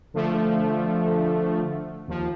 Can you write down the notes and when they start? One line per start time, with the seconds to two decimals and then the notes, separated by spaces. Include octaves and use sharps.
0.14 D3 F3 A3
2.08 D#2 F3